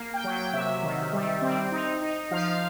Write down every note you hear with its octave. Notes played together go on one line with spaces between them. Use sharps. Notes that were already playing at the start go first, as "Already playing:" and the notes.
Already playing: A#3
G5
F#3
G5
C3 E5
D#3
G3
C4
D#4
D#4
F3 F5